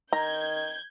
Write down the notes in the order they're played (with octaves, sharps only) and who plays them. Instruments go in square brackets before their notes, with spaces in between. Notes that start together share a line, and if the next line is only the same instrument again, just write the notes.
[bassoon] D#3 [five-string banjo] A#5 [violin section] G6 G#6